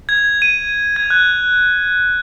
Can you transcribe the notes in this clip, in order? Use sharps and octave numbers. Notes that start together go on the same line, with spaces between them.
G#6
D#7
G#6
F#6